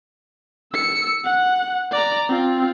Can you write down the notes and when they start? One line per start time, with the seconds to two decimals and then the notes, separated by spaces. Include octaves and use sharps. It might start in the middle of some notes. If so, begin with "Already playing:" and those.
0.73 E6 C#7
1.25 F#5
1.91 D5 A#5
2.29 C4 F4